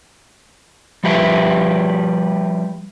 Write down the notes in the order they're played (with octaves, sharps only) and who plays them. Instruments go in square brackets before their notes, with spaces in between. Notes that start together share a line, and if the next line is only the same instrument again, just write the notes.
[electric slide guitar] F3 G3 G4 B4 E5